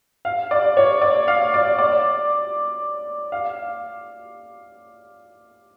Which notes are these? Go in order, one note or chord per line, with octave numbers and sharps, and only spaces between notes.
F5
D5
C#5
D5
F5
D5
D5
F5